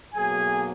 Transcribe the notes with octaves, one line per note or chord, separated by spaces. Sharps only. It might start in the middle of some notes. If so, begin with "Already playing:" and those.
B1 B2 F#3 A#3 G#4 G#5